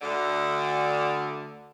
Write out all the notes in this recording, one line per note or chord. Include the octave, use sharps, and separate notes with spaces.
D2 D3